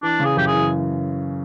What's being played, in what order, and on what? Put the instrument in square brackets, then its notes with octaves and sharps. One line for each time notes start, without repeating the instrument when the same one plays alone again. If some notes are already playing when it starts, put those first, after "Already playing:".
[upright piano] E3 [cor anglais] D4
[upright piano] C#3
[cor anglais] G#4
[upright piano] F#2 [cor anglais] G4
[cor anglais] G#4
[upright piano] E3